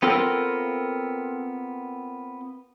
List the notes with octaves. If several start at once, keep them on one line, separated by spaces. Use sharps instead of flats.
B3 C4 F4 A4 A#4